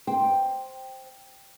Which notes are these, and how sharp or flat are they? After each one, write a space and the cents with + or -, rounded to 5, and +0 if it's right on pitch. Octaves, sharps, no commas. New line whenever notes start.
C5 +0 G5 +0